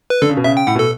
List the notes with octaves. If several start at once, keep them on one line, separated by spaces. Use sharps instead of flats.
B4
D3 A4
C#3
B2
C#3 E5
G5
A2 F#5
B2
A4